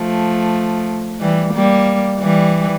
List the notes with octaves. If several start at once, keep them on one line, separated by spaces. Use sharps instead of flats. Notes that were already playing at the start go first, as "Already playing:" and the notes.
Already playing: F3 A3
E3 G3
G3 A#3
E3 G3